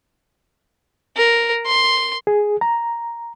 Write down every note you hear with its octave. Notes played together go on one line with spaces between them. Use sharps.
A#4
C6
G#4
A#5